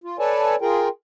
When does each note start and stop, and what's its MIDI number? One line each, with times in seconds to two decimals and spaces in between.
0.04 0.17 65
0.19 0.56 69
0.19 0.56 71
0.19 0.56 73
0.19 0.56 74
0.19 0.56 80
0.19 0.56 81
0.61 0.88 65
0.61 0.88 68
0.61 0.88 70
0.61 0.88 79